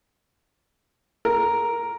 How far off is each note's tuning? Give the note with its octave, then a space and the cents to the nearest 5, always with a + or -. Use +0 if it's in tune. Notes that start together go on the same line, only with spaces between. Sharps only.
A#4 +5